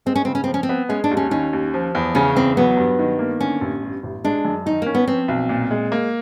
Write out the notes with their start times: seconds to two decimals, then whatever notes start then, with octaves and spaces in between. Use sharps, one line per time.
0.06 G#3 C4
0.16 C#4
0.25 C#3 C4
0.35 C#4
0.44 F3 C4
0.54 C#4
0.63 C4
0.69 B3
0.89 G#3 C#4
1.04 D4
1.11 D#2
1.17 C#4
1.31 D#3 C#4
1.53 D#2
1.74 F3
1.95 E2
2.15 C#3 C#4
2.35 E2 C4
2.57 F#3 B3
2.77 G2
2.99 D#3
3.19 A#3
3.40 D3 C#4
3.61 A1
3.83 G2
4.03 A1
4.25 G#3 D4
4.45 F#2
4.66 D#3 D#4
4.82 A#3 C#4
4.95 B3
5.08 F3 C4
5.28 B1
5.49 A#2
5.71 G#3
5.92 A#3